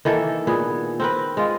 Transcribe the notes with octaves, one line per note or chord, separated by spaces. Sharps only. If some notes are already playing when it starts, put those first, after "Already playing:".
D#3 E3 A#3 A4
A#2 B3 G#4
C4 A#4 B4
G#3 F4